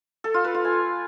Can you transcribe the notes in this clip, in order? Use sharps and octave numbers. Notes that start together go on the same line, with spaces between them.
A4
F4
B4
F4
G#5